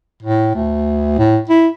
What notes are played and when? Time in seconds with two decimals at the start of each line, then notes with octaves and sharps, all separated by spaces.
0.23 A2
0.55 D2
1.18 A2
1.49 E4